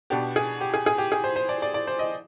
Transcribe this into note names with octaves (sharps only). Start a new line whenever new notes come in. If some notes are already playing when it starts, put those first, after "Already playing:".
B2 B3 D4 G4
G#4
G4
G#4
G#4
G4
G#4
C5
C5
D5
D5
D5
C5
D#5